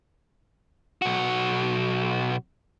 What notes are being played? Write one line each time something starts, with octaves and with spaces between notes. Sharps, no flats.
B1 F#4